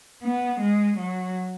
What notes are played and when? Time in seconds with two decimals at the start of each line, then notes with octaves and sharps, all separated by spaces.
0.23 B3
0.60 G#3
0.98 F#3